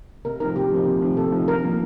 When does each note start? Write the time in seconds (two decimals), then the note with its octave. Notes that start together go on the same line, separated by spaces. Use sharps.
0.25 C3 A#4
0.40 F3 C4 D#4 A#4
0.56 C3 G4
0.71 F3 C4 D#4
0.87 C3
1.01 F3 C4 D#4
1.17 C3 A4
1.32 F3 C4 D#4
1.48 D3 A#4
1.63 F3 A#3